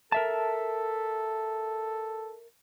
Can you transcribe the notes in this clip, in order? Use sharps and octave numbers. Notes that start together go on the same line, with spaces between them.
A4 A#4 E5 A5